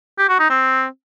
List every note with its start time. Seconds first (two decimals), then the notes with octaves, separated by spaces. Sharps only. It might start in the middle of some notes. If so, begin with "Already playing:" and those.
0.18 G4
0.29 F#4
0.39 D#4
0.50 C4